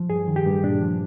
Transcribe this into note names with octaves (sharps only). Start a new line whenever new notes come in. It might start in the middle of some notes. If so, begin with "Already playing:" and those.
Already playing: F3
G2 G#4
D#3
G4
G2
A#2 D4
F3